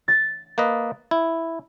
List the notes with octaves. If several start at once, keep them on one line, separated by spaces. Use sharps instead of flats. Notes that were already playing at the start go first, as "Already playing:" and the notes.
A6
A#3 B4 D#5
E4